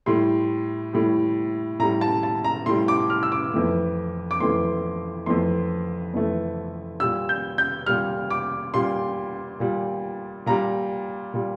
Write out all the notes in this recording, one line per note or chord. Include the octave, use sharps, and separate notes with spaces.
A2 G3 C6
A2 G3
A2 G3 A#5
A5
A5
A#5
A2 G3 C6
D6
F6
E6
D6
F2 E3 A3
D6
F2 E3 A3 C6
F2 E3 A3 C6
F2 E3 A3
A#2 G3 E6
G6
G6
A#2 G3 F6
D6
A#2 G3 C6
A#2 G3
A#2 G3 A#5
A#2 G3